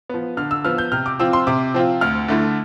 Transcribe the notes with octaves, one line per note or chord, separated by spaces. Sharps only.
F3 B3
D3 F6
E6
F3 B3 F6
G6
C3 F6
D6
F3 C4 F4 E6
C6
C3 D6
F3 C4 F4
D2 F6
D3 A3 E4